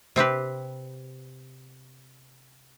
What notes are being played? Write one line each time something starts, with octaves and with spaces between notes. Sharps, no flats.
C3 C4 G4 B4